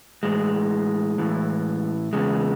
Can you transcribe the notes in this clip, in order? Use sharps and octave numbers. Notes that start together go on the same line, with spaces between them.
A2 E3 G#3
A2 E3
E2 C#3 G#3